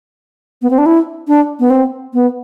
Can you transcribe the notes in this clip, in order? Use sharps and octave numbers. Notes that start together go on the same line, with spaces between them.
B3
C4
D4
E4
D4
B3
C4
B3